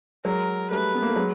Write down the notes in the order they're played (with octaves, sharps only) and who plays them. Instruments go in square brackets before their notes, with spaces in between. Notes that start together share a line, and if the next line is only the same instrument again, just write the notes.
[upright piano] F#3 G#3 [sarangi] A#4
[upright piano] G3 A3 [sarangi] B4
[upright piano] B3
A#3
A3
F#3 G#3